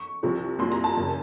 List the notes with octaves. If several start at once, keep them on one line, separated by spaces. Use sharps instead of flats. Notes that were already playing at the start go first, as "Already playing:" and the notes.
Already playing: C#6
C2 C3 F3
C2 A#2 F#3 C6
A#5
A5
F#1 F#2 C#3 F#3